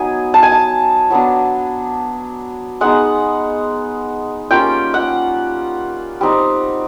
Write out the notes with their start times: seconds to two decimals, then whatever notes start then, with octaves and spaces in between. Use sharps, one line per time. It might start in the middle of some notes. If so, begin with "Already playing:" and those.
Already playing: F#3 B3 D#4 G#5
0.34 A5
0.43 G#5
0.52 A5
1.11 F#3 B3 D4
2.81 G#3 B3 D#4 F#5
4.51 G3 A#3 C#4 F4 G5
4.94 F#5
6.21 G3 C4 D#4